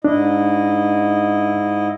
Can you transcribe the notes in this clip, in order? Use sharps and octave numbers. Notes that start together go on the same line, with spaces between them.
G#2 D4 E4 D#5